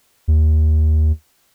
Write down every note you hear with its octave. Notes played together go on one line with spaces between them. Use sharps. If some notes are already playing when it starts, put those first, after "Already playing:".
D#2